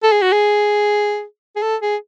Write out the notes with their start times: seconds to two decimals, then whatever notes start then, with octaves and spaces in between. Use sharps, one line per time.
0.03 A4
0.12 G#4
0.22 F#4
0.32 G#4
1.56 G#4
1.62 A4
1.82 G#4